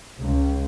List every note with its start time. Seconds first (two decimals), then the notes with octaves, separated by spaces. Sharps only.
0.20 C#2